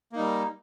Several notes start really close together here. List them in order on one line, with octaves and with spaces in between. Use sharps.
A#3 D#4 G3